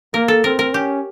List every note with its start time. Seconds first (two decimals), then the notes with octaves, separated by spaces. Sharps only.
0.14 A#3 A#4
0.28 A4
0.44 C4 A#4
0.59 A#4
0.73 C#4 G4